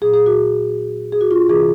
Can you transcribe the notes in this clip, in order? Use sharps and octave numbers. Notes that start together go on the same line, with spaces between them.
A#2 F#3 G#4
G#4
F#4
G#4
F#4
F4
C3 E3 G#4